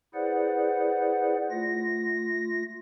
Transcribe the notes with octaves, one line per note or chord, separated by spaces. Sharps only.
E4 G#4 B4 C5 D5 F#5
A3 F4 A#6